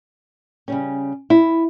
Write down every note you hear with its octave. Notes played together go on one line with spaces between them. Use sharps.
C#3 G3 C#4
E4